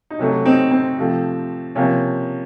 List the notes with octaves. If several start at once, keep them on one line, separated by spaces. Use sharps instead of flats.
D#4
C3 F#3 A3 C#4
C4 D#4
C4
C3 F3 A3
C3 F3 A#3 C#4